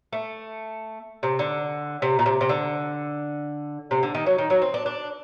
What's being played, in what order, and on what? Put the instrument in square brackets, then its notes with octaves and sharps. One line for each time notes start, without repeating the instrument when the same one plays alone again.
[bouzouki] A3
C3
D3
C3
A#2
C3
C3
D3
C3
D3
D#3
F#3
D#3
F#3
C4
D4
D4